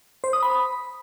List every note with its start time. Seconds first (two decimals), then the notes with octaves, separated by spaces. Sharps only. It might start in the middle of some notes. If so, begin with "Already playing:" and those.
0.24 C5
0.33 D#6
0.42 B5